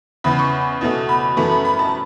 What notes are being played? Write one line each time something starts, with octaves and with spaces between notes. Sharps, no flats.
E2 C#3 E3 B5
C#6
E2 B2 A3
B5
F#2 E3 A3 B5
B5
B5
A5